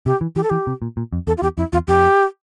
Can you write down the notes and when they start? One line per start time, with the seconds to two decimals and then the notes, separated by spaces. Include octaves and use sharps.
0.06 C3 G4
0.21 E3
0.36 E3 G4
0.43 A4
0.50 E3 G4
0.67 C3
0.82 A#2
0.97 A#2
1.13 F2
1.27 E2 A4
1.38 F4
1.42 E2 G4
1.57 F2 E4
1.73 E2 F4
1.88 F2 G4